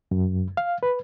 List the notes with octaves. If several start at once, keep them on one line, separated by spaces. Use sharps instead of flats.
F#2
F5
B4